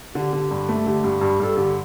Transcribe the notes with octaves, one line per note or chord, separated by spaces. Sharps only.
D3 G4
D3
G2
A3
D3 G4
G2
G2
G2 A4
D3 G4